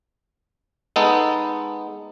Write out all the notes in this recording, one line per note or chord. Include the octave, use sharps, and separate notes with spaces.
G#3 B3 D#4 A4